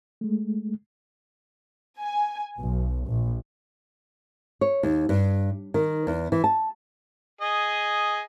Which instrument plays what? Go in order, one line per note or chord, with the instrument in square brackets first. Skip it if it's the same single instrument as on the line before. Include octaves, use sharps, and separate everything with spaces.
[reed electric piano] G#3 A3
[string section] G#5
B1
A#1
[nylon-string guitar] C#5
D#2
G2
D#3
E2
E3
A5
[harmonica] G#4 D#5